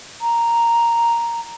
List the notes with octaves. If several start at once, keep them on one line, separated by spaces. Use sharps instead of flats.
A#5